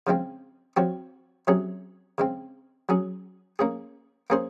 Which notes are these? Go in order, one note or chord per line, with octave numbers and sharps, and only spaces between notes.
C#3 F3 G#3 C4
F3 C4 F#4 C#5
C3 F#3 C#4 G#4 C#5
C#3 G#3 C4
F#3 C#4 G#4
A#3 C#4 G#4
A#3 C#4 G#4 C5